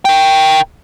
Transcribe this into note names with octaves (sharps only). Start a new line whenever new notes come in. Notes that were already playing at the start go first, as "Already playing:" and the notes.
A#4 G5